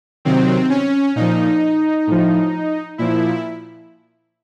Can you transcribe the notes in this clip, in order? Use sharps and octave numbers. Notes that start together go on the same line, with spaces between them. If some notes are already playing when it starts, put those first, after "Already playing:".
C3 D#3 F#3 C4
C#4
A#2 F3 D#4
A2 F3
A#2 F3 E4